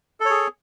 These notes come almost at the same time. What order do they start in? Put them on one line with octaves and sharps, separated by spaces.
A4 C#5 G#4